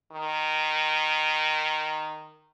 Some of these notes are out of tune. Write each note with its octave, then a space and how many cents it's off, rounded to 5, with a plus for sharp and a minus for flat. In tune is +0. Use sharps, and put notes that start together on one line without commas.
D#3 -10